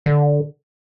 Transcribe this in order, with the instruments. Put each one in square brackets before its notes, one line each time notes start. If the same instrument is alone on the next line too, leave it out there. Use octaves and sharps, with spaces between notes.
[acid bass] D3